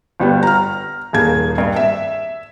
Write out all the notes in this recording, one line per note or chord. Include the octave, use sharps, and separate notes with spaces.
G1 G3 B3
A#5 F6
D#1 A#3 G#4 G#6
G2
E5